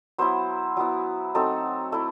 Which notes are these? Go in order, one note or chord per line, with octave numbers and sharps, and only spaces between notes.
F#3 B3 E4 C5
F#3 B3 E4
F#3 A3 C4 D#4 A4
A3 E4